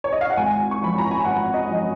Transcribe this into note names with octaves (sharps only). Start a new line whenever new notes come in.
C#5
D#5
F5
F#5
G#1 G#5
C#6
F#2 F3 B5
A#5
G#5
G#1 F#5
D#5
F#2 F3